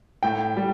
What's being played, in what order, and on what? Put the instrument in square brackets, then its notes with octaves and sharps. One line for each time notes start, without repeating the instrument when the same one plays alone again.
[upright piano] A2 [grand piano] G5
[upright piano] G3